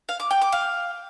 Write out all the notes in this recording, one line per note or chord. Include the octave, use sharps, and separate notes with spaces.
F5
D6
G5
D6
F5